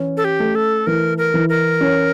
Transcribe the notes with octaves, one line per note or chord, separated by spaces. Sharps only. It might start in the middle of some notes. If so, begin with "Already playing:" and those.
Already playing: E3 C#4
A4
G4
A3
A4
E3 A#4
A#4
E3
A#4
C#4